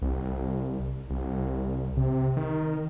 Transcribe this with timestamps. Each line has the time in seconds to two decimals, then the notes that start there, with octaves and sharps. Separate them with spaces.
0.02 C2
1.10 C2
1.97 C3
2.37 D#3